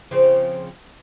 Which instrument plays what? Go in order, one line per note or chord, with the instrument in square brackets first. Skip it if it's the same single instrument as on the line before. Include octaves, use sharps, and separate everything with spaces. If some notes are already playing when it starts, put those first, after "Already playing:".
[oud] C#3 F3 C4